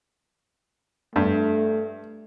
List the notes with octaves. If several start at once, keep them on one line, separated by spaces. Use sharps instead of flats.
G2 A3